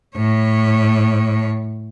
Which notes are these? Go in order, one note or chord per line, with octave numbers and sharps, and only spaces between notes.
A2 C#5